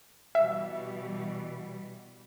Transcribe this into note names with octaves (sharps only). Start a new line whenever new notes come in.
B2 E3 G3 E5